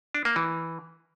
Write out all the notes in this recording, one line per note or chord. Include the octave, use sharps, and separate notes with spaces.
D4
A#3
E3